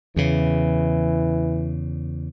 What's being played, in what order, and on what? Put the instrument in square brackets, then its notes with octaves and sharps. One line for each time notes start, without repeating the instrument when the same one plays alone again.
[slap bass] E2 C#3 [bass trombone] E3